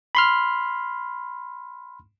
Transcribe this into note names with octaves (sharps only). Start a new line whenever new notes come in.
B5 C6 F6